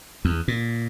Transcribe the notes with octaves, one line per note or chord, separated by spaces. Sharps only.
E2
A#2